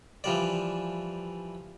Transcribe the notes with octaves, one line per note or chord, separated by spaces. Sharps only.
E3 F3 G3 D5